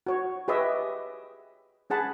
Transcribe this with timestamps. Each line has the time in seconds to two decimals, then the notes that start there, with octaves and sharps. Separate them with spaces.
0.06 F#4 C#5
0.48 G4 G#4 B4 C#5 D#5 E5
1.90 C#4 G#4 F#5 A5 B5